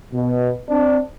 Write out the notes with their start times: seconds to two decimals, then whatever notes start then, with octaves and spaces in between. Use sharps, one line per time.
0.14 B2
0.69 C4 D4